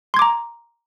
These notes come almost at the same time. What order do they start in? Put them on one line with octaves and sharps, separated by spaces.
C6 G#6 D6 A#5